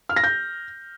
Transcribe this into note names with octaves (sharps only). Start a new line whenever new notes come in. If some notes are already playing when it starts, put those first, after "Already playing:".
F6
A#6
G6